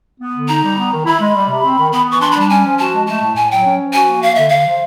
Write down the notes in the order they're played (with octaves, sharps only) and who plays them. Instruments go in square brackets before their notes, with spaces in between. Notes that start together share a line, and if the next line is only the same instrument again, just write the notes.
[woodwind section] B3
D3
[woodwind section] D#4 [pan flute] A#5
[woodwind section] G3
B3
D#3
[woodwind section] E4 [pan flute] B5
[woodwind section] G#3
G3
C3
C4
D#3
[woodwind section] B3 [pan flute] B5
[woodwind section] E3 [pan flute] C#6
[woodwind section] D4 [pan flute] C6
[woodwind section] G3 [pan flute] B5
[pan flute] A5
[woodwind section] C#4 [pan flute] G#5
[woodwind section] F3
[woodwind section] F#4 [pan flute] A5
[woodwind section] G#3
[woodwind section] A3 [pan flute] A5
[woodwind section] A2
[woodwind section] A2 [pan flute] G#5
[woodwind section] F#3 [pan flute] G5
[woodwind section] C#4
F3
[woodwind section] F#4 [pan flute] G#5
[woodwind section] A#3
[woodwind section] A#3 [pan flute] F5
[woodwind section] D3 [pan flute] E5
[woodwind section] D3 [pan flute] F5
[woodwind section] F3